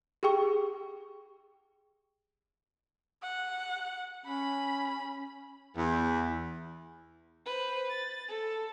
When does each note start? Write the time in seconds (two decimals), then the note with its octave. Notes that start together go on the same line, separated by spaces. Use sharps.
0.23 G4 G#4 G5 C#6
3.23 F#5
4.26 C#4 B5
5.76 E2
7.46 B4 C5
7.90 A6
8.28 A4